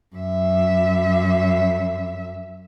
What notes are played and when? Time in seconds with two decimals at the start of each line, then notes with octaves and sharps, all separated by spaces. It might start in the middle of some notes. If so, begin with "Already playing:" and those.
0.16 F#2 E5